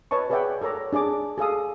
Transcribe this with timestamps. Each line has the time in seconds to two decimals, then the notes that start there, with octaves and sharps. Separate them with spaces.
0.11 B4 C#5 D#5 A5 C#6
0.30 G#4 B4 D5 E5 F#5 G5
0.62 A4 A#4 C#5 A#5 D6
0.93 D4 G#4 D5 D6
1.38 G#4 A4 F5 D#6